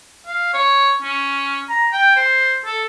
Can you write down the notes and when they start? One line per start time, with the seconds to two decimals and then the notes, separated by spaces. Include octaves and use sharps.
0.26 F5
0.53 C#5
1.02 C#4
1.69 A#5
1.93 G5
2.16 C5
2.66 A4